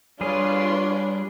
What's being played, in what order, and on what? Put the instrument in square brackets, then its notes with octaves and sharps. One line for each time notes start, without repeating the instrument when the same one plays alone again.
[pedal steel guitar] G3 G#4 [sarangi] D4 [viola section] F4 B4 C6 [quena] C#5